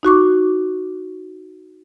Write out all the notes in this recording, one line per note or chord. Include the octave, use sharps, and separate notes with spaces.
D#4 F#4 C#6 D6